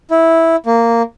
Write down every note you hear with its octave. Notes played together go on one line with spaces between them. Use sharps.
E4
A#3